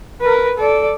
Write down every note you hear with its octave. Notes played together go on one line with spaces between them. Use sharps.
A#4 B4
A4 D5